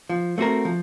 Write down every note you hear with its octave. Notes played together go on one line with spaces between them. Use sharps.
F3
A3 C4 F#4 A#4
F3